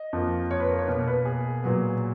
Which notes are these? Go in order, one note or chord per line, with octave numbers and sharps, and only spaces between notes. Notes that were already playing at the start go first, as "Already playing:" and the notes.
Already playing: D#5
F2 F3 A#3
C#5
B4
A#4
C#5
B2 A#3
B4
G#4
A#2 F#3 B3